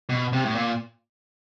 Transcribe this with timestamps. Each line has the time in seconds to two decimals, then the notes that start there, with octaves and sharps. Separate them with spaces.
0.09 B2
0.33 C3
0.45 A2
0.55 A#2